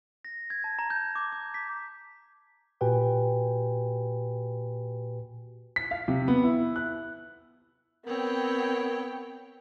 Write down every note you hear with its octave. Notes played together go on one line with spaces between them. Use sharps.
A#6
G#6
A5
A#5
G6
D6
D6
B6
A#2 F#4 G4 B4 G5 G#5
B6
F5
C3
B3
E4
F#6
B3 C4 A#4 C#5 G5